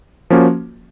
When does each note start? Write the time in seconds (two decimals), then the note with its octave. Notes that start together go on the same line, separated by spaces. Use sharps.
0.30 F3 A#3 C#4 F#4